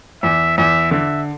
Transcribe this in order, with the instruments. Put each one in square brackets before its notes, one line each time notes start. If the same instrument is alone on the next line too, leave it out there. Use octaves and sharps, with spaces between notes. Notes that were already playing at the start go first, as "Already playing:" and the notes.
[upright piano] E2 [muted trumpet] E5
[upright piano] E2 [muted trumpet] E5
[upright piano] D3 [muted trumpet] E5